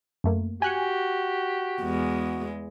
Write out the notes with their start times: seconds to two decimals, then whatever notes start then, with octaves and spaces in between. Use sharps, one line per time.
0.24 F#2 A3 A#3
0.62 F#4 G4 G#5 F#6 C#7
1.82 E2 G#3